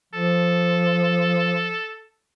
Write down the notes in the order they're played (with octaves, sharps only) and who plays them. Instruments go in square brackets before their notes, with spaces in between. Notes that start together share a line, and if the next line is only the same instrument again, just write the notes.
[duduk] F3 [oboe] A4